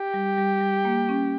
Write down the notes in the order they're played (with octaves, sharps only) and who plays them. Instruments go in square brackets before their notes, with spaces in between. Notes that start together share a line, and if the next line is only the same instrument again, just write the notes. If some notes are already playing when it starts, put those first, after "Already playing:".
Already playing: [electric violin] G4
[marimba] G3
G3
G3
A#3
C#4